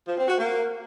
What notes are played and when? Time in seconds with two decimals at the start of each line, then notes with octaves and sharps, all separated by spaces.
0.06 F3
0.17 C4
0.28 F#4
0.38 A#3